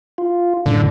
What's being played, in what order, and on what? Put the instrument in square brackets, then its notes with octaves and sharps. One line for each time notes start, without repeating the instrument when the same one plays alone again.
[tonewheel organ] F4
[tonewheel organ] F#2 A2 [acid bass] D3